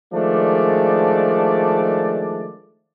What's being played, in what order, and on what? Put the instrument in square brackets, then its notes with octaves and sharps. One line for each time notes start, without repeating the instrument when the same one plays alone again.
[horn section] D#3 F3 G#3 A3 D4 D5